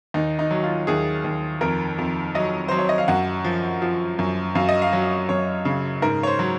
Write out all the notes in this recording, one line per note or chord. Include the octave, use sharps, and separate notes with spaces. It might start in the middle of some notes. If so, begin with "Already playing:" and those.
D#2 D#4
D#4
F#3
F4
D#2 G#4
D#2
F2 A#4
F2
F#3 D#5
F#3 C5
C#5
D#5
F5
F#2 F#5
F3
F3
F#2
F#2 F5
D#5
F5
F#3
F#2 C#5
C#3
G#2 A#4
C#5
C5
F#3